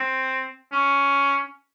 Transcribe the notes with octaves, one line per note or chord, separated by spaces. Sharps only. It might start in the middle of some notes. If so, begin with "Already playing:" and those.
Already playing: C4
C#4